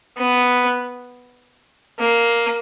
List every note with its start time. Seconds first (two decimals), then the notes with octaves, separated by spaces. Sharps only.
0.17 B3
1.99 A#3